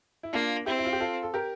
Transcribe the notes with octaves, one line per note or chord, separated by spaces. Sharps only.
E4
A#3 D4 F4
C4 E4 G4
E4
F4
G4
F4 A4
A4
G4 A#4